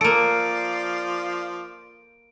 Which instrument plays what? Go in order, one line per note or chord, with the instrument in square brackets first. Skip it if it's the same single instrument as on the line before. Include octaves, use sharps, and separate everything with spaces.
[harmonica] F3 F4 D5 [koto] A#3 A4 [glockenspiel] D7